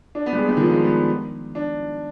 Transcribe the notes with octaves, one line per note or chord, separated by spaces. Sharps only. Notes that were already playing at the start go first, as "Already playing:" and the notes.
D4
B3
G3
G#3
G3
D#3
F3
G#3
B3
D4